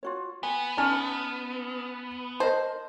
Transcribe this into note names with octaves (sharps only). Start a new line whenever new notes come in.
F4 F#4 C#5
B3 G#5
C#4 D#4 G#5 A5 F6
A#4 C5 D#5 A5